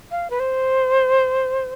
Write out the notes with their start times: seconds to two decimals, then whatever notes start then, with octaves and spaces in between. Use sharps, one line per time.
0.11 F5
0.30 B4
0.40 C5